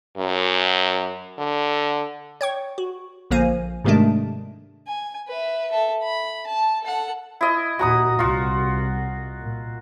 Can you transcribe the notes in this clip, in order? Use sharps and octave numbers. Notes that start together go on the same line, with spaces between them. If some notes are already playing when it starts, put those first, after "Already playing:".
F#2
D3
C#5 G5 C#6
F#4
A#1 D3 F3 A#3 G#5 D#7
G#2 C3 D#3 G#3 A3 D4
G#5
B4 E5
A4 E5
B5
A5
A4 F#5
E4 D#5
D#2 A#2 F#4 A#5 D#6
C2 F4 F#4
A#2